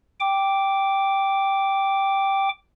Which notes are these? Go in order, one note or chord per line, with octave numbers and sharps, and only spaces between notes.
G5 D6